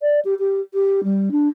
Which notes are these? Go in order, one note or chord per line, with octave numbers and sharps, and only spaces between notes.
D5
G4
G4
G4
G3
D4